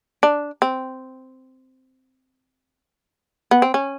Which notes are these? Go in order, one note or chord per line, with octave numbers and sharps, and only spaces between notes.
D4
C4
B3
C4
C#4